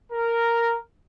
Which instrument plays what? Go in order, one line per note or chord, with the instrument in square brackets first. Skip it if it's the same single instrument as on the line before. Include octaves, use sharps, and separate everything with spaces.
[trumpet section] A#4